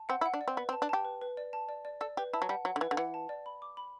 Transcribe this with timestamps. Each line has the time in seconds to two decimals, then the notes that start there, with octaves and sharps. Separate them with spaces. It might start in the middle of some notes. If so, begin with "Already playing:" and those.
Already playing: A5
0.09 C4 F#5
0.21 E4
0.26 F#5
0.34 D4
0.41 D5
0.48 C4
0.57 B3 B4
0.69 C4
0.73 A5
0.82 D4
0.89 G4 A5
1.05 B4
1.21 B4
1.37 D5
1.53 A5
1.69 D5
1.85 D5
2.01 A4 D5
2.17 G4 B4
2.33 E4 A5
2.42 F#3
2.49 G3 F#5
2.65 F#3 F#5
2.76 D3
2.81 E3 B4
2.91 D3
2.97 E3 F#5
3.14 A5
3.29 D5
3.46 B5
3.62 D6
3.77 B5